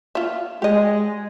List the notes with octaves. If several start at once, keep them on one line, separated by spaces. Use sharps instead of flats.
F4 E5
G#3 G4 D#5